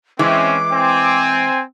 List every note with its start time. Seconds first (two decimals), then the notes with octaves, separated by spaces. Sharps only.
0.19 E3 G#3 C4 C#4 D6
0.71 C4 G#5